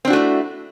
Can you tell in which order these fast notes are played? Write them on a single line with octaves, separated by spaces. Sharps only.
C4 D4 F#4 A3 E4